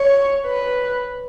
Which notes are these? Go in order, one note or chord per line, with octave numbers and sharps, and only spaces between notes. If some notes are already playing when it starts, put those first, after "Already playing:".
Already playing: C#5
B4